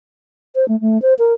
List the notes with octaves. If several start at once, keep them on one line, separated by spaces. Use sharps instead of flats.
C5
A3
A3
C5
A#4